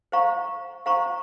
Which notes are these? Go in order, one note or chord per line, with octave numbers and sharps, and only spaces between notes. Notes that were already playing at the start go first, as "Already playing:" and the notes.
C5 F5 A#5 C#6
C5 F5 A#5 C#6